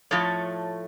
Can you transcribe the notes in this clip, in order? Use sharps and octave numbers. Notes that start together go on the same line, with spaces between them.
A2 F3 A3 A4 C#5